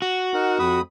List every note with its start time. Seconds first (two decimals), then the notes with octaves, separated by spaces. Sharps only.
0.02 F#4
0.34 D#4 A#4 F#5
0.59 F2 B5 D#6